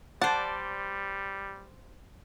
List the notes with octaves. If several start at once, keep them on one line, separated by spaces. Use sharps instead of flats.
G3 C5 D5 F#5 A5